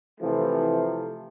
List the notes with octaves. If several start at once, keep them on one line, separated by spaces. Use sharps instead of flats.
C3 E3 F3 A3